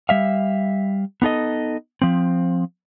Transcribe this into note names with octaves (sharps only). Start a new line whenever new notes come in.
G3 E5 F5
B3 D#4 A4 D#5
F3 C4